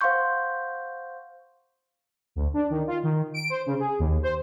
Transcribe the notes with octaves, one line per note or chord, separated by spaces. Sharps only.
C5 F5 F#5 C6 C#6 G6
D2
D4
D#3
F4
D#3
D7
C5
C#3
G#4
D#2
C5